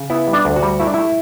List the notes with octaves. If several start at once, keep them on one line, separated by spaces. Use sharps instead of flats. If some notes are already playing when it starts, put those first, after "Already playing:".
Already playing: C#3
B3 E4
G3
D4
D2
F#4
G3
A3 E4
D4
A3 E4